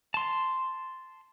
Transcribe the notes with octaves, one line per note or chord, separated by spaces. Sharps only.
A5 C6